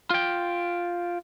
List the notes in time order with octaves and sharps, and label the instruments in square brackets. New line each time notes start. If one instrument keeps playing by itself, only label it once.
[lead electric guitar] F4 G5